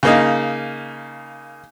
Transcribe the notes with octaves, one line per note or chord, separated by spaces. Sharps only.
C#3 A#3 D#4